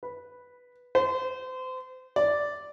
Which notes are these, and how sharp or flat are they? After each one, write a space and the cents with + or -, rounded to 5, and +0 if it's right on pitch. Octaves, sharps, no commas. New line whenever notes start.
B4 -5
C5 -30
D5 -5